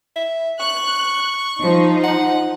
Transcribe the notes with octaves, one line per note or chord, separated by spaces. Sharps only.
E5
C#6 F#6
F3 D#4
F#5